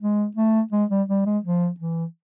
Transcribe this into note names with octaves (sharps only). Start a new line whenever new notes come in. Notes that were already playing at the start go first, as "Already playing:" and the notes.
G#3
A3
G#3
G3
G3
G#3
F3
E3